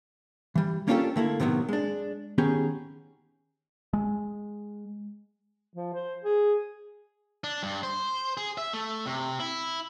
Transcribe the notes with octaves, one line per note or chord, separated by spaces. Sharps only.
E3 G3
A#3 C#4 D4 F4 G4 A4
D3 A3 A#3 E4
A2 C3 D#3 F#3 B3
G#3 D4
D#3 B3 C#4 G4 G#4
G#3
F3
C5
G#4
D4
G2
C5
G#4
E5
A3
C3
E4